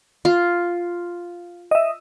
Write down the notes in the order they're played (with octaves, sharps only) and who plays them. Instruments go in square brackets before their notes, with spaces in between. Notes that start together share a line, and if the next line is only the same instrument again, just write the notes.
[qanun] F4
[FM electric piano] D#5 E5